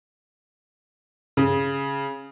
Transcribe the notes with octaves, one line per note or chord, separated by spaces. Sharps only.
C#3